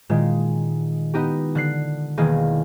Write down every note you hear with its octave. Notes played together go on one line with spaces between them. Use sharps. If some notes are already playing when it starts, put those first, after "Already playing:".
A#2 D#3 G#3
B3 D#4 G4
D3 F#6 C7
E1 D#3 A#3 G#4